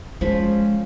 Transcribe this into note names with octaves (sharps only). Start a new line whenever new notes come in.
F3 G#3 C#4 B5